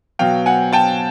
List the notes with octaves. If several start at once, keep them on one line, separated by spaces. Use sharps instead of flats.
B2 F#3 F5 G5
F#5 G#5
G5 A5